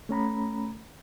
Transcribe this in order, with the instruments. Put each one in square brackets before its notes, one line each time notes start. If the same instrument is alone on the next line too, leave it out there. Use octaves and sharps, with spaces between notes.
[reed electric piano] A3 C#4 A#5 B5